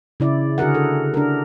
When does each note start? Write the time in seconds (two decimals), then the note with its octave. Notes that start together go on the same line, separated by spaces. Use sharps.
0.20 C#3 E4 D5
0.58 D3 F#4 G#4 A#4 F#5
0.74 A4
1.14 D4 A#4